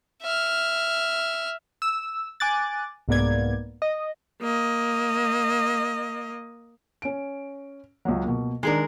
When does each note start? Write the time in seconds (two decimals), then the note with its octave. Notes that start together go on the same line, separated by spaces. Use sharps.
0.22 E5 F6
1.82 E6
2.40 G#5 D6 F#6 A6
3.08 C2 G#2 A#3 B3 D5 G#6
3.82 D#5
4.41 A#3 D#5
7.02 C#4 D7
8.05 C#2 F#3
8.24 B2 A#3
8.63 D#3 G#3 D4 G#4 A#4